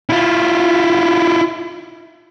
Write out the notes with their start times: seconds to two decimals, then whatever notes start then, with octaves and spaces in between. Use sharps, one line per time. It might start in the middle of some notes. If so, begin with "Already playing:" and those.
0.09 E4 F4